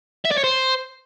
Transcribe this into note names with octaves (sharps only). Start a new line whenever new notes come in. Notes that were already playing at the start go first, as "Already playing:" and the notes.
E5
D5
C#5
C5